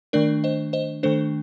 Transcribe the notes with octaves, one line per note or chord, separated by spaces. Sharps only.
D#3 A3 D4 A#4 D5
C5 D#5
C5 D#5
D#3 A3 D4 A4 C5